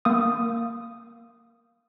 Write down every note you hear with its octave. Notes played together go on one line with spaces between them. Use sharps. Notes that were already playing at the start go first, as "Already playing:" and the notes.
A#3 D#6